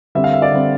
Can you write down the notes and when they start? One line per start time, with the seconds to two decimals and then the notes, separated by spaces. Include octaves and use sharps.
0.15 D3 G3 C4 E5
0.24 F5
0.33 E5
0.42 D5
0.51 D3 G3 C4